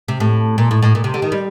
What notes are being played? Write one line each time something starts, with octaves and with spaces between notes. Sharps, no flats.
C3
A2
A#2
A2
A2
A#2
C3
D3
D#3
G3